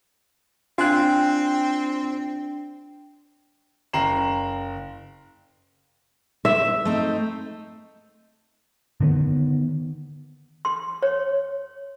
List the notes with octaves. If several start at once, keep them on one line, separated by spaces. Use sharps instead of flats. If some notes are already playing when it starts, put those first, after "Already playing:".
C4 D4 F4 G5 G#5 F#6
F#1 G5 A#5 C7 E7 F#7
E5
A3 C4 D#4
D3 D#3 A#3 B3
C6
C#5